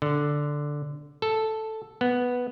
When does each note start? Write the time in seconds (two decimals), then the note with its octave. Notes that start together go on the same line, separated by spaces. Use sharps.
0.02 D3
1.22 A4
2.01 B3